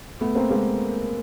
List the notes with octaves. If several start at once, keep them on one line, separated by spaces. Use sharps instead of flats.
A3 B3
A#3 C4
G#3 A#3